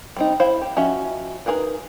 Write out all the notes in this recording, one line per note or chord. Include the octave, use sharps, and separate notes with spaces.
G3 C4 D#4
E4 C5 F5
G4
F3 C#4 F#4 D#5 E5
D#4 E4 G#4 A#4 B4